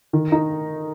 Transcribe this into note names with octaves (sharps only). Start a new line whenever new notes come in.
D#3
D#4